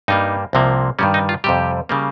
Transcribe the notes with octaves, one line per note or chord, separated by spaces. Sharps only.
G2 G3 A#3 D#4
C2 C3 F3 A#3
G2 D#3 G3 C#4
D#4
F4
F2 C3 G3 G4
C#3 G3 A#3